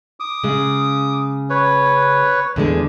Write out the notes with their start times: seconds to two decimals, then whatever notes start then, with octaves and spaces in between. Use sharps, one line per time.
0.20 D6 D#6
0.44 C#3 G#3
1.50 B4 C#5
2.56 E2 D3 G#3